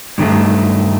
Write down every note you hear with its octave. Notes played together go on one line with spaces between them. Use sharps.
G2 D#3 A3